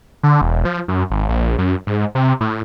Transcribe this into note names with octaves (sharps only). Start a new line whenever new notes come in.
D3
E1
F3
F#2
G#1
A#1
F#2
G#2
C3
A2